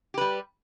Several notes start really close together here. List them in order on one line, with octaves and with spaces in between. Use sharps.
G4 B4 G3